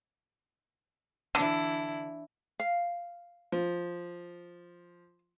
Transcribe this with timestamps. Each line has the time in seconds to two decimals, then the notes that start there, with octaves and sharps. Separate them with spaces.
1.35 D3 E3 D4 E4
2.60 F5
3.52 F3